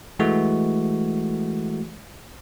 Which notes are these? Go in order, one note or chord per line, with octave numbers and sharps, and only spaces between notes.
E3 G#3 A3 F#4